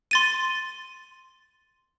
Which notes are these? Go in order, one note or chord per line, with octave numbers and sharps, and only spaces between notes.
C6 A6 D#7